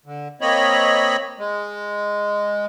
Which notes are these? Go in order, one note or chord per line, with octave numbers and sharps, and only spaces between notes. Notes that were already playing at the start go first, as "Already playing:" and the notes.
D3
A#3 C4 C#5 D#5 B5
G#3